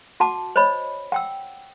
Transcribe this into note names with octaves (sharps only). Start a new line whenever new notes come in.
F#4 F#5 A5 D6
C5 C#5 D#5 B5
F#5 G5 E6